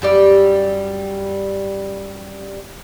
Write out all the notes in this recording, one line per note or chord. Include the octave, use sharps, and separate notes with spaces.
F#2 G3 D5